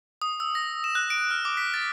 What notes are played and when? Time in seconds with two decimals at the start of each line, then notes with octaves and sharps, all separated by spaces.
0.22 D#6
0.40 E6
0.55 A#6
0.84 E7
0.95 F#6
1.10 D7
1.31 F6
1.45 D6
1.57 B6
1.74 A6